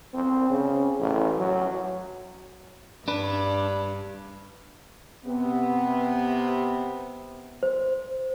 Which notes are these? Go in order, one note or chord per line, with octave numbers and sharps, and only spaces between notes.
C4
C#3
A1
F#3
G2 D4 B4
C3 B3
C5